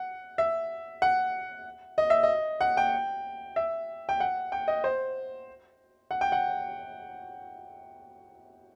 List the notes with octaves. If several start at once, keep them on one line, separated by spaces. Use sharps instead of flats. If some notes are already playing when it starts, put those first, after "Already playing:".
Already playing: F#5
E5
F#5
D#5
E5
D#5
F#5
G5
E5
G5
F#5
G5
D#5
C5
F#5
G5
F#5